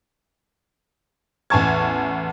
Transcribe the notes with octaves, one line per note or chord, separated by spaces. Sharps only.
A1 E2 G#5 A5 C#6 G#6